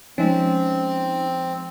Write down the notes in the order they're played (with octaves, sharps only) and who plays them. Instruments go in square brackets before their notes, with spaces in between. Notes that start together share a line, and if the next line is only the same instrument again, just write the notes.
[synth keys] F3 G#3 [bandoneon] C4 [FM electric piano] C#4 D#4